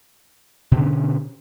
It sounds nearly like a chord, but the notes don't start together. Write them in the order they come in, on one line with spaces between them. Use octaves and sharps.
B2 D3 C#4